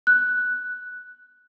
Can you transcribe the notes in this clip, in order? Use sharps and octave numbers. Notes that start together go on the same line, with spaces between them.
F#6